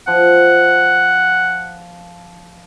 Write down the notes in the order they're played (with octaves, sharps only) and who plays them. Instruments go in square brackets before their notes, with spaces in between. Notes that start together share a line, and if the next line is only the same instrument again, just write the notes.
[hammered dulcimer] F3 [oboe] F#5